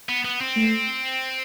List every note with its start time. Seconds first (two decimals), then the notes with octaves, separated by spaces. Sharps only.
0.09 B3
0.25 B3
0.41 C4
0.57 A3